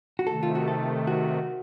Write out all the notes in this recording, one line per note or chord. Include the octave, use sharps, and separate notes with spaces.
F#4
C3 D#3 A3 A4
F4
F#4
A4
F#4